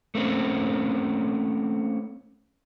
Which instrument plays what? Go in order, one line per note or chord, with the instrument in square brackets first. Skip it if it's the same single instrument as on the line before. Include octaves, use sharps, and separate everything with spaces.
[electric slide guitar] A3 A#3 C4 C#4